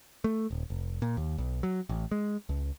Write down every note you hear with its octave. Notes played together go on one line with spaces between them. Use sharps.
A3
D#1
F1
A#2
D#2
B1
F#3
A1
G#3
C#2